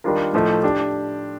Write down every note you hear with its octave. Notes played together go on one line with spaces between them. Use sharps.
D#3 G3 D4 F4 A#4
A2 F3 A3 D#4
D4 G4